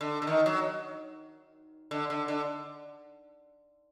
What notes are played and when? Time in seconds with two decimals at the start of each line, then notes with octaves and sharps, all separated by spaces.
0.01 D3
0.22 D3
0.27 D#3
0.46 F#3
1.91 D3
2.10 D3
2.28 D3